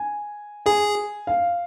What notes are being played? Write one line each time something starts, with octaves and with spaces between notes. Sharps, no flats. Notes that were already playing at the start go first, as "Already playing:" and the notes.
Already playing: G#5
G#4 G#5
F5